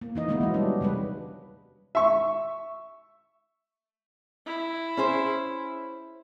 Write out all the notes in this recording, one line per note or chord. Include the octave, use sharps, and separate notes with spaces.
A#3
E3 D#4 D#5
D#3 G#3 A#3 B3 D#4 E4
E3 F#3
G3 D4
C3 G3 G#3 B4
E5 C#6
E4
C#4 G#4 C5